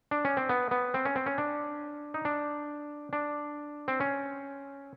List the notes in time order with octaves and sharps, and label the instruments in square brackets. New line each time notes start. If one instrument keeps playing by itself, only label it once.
[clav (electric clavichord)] D4
C#4
C4
B3
B3
C4
C#4
C4
C#4
D4
D#4
D4
D4
C4
C#4